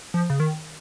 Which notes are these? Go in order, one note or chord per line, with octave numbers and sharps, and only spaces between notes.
F3
C#3
D#3